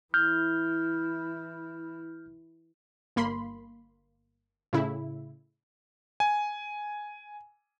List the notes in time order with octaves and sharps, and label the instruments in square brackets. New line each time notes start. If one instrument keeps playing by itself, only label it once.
[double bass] E3 E4 [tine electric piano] F6 G6
[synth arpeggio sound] G1 A#3 B5 C6
A2 C#3 E4
[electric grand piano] G#5